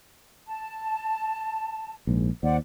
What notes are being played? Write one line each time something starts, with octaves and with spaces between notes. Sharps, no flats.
A5
A#1 G#2
D#2 C5 D5 F#5